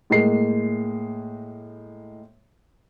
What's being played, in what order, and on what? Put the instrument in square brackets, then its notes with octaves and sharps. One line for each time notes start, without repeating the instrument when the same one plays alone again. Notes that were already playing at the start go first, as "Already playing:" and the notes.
[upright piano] A2 G#3 A#3 C7